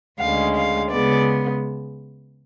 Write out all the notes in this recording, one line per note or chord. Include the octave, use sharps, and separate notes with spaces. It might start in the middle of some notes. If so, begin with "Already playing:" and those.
D2 C#3 G#3 F5
F5
C#3 G#3 B3 D5